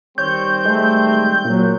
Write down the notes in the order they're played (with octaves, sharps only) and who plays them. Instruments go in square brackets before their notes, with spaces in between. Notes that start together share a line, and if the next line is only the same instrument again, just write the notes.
[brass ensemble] D#3 G3 C4 [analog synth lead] C#5 [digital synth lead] G6
[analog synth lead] G#3 [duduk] A3
[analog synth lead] A#2 [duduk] F#3